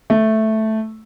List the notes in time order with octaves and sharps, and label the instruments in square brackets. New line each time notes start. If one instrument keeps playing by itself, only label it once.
[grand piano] A3